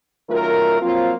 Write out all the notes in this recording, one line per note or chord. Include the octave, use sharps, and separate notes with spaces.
F#2 D#3 A3 F4 A#4
F3 F#3 A#3 C4 F4